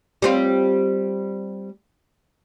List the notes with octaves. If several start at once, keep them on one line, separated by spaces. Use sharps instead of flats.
G3 C4 F4